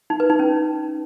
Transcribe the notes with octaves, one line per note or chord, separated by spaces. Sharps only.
D#4
B4
D#4
C#4